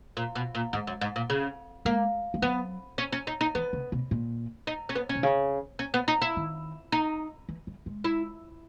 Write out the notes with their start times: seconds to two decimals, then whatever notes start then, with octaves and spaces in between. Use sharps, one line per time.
0.17 A#2
0.35 B2
0.55 A#2
0.73 G#2 G#3
0.87 F#2
1.01 G#2
1.16 A#2
1.30 C#3
1.85 G#3 A#3
2.34 G#3
2.42 F#3 B3
2.98 C#4
3.12 C#4
3.27 D#4
3.41 D#4
3.55 E3 B3
3.73 C#3
3.92 B2
4.11 A#2
4.67 D#4
4.89 C#4
4.95 B3
5.09 C#4
5.15 B2
5.23 C#3
5.79 C#4
5.94 B3
6.08 D#4
6.22 E4
6.37 D#3
6.92 D#4
7.49 E3
7.67 F#3
7.86 G#3
8.04 E4